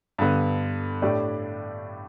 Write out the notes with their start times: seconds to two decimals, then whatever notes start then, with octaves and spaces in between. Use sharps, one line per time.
0.18 G2 D3 B3
1.02 A2 A3 D4 G4 D5